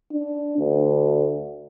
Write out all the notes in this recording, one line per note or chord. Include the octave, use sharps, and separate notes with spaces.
D4
D2